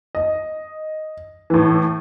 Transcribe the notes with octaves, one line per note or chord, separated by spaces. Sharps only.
D#5
A2 E3